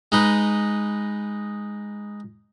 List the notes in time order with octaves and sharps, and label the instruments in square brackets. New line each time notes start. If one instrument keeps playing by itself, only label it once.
[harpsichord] G#3 D#4 B4